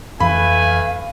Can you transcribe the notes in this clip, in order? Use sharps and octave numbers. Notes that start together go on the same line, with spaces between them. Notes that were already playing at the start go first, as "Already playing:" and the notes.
F2 E3 A3 B4 F5 G#5 B5